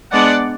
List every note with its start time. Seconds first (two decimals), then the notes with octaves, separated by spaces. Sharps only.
0.12 G#3 B3 D4 D5 F#5